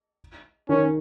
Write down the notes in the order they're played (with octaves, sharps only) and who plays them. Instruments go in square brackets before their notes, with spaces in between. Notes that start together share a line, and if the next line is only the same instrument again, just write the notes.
[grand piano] D#3 [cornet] C#4